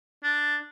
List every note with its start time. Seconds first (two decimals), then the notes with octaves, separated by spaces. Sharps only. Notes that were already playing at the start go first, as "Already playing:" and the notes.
0.23 D4